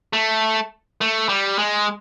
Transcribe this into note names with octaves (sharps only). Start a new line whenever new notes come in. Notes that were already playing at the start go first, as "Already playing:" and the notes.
A3
A3
G3
G#3